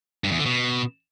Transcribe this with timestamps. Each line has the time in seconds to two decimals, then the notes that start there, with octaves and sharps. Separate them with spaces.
0.24 G2
0.31 E2
0.39 D3
0.46 B2